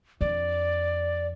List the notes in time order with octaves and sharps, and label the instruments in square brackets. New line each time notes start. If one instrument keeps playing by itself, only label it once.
[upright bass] F2 D4 [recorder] D5